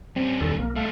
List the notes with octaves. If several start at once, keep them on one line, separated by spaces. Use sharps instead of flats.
G3 C4 C#4
E2 D#3 A4
B1 A#3
G3 A3 A4 F5